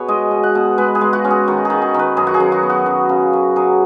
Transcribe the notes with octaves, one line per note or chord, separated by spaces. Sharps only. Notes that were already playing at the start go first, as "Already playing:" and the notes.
Already playing: B2 G#4 B4 C#5
G#3 D#5
B2
F#5
B2
G#3 B4
G#4
G#3
F#4
C#4
G#4
D#3 F#4
D#3 G#4
G#4
D#3 B4
F#2 G#4
F#4
G#4
F#2
F#4
B3
F#4
F#2
C#3
F#2
F#3 G#4